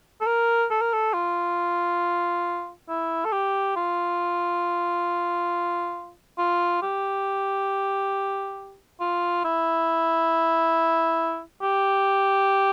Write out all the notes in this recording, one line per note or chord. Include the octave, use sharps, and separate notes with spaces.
A4
A#4
A4
A#4
A4
F4
E4
A4
G4
F4
F4
G4
F4
E4
G4